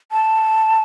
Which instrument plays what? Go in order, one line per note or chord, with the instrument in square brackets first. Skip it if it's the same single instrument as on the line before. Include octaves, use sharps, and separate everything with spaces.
[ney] A5